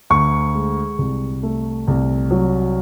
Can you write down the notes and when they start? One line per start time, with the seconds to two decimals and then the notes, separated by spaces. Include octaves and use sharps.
0.10 D2 C#6
0.54 G#3
0.99 C2
1.43 A3
1.88 C2
2.31 F#3